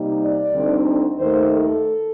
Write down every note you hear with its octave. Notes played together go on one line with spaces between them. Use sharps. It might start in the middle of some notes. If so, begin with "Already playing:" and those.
Already playing: C3 G3 A#3 D#4
D5
D2 D3 G3 C4 D#4
D#2 D#3 A3 C5
A4